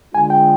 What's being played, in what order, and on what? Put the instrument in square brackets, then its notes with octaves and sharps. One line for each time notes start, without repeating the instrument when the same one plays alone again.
[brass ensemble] D3 G#3 D4 F4 [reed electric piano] G#5
[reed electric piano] G5